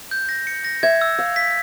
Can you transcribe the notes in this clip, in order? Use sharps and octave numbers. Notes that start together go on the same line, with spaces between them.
G6
A#6
C#7
A#6
E5 G#6
E6
F5 E6
B6